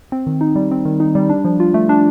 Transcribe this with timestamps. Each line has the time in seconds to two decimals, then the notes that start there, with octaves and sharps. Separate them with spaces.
0.12 C4
0.27 D#3
0.41 D#4
0.56 G3
0.72 C4
0.85 D#3
1.00 D#4
1.15 G3
1.30 D4
1.45 F3
1.60 F4
1.74 A3
1.89 D4